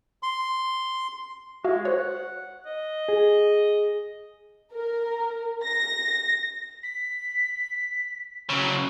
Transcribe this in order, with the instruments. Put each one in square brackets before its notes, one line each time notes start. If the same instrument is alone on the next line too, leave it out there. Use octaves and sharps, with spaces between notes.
[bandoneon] C6
[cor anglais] G#3 [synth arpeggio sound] F#4 E5 F5
[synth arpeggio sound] C5 C#5 [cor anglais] F#5
[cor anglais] D#5
[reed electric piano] G#4
[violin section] A#4
A#6
[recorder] B6
[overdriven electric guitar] C#3 F#3